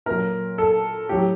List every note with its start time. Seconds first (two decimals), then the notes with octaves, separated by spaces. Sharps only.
0.06 A#2 F#3 A#4
0.58 A4
1.09 A2 F#3 G4